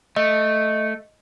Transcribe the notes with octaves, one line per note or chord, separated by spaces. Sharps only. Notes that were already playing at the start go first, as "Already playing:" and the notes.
A3 D#5